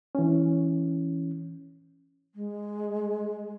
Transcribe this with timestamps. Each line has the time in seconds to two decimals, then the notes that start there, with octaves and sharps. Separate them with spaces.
0.15 E3 C#4
2.33 G#3